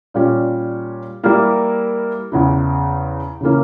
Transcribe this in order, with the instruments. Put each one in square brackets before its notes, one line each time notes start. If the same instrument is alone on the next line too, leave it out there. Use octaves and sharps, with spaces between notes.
[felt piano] A#2 G3 C#4
G3 A#3 E4 A#4
E2 C#3 E3
C#3 E3 A#3 C#4